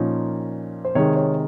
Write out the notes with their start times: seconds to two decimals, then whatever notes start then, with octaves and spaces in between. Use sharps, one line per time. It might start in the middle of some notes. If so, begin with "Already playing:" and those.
Already playing: A#2 F3 A#3 C#4 D#4
0.85 C5
0.95 C3 D#3 G#3 C#5
1.16 C#5